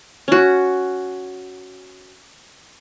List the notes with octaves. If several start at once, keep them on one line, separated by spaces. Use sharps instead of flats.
C#4 F#4